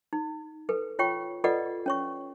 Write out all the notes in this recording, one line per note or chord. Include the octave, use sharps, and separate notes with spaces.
D#4
A4 B4
F4 C#5 G5 C#6
F4 A4 B4 D5 D#5 F#5
C#4 C#5 C#6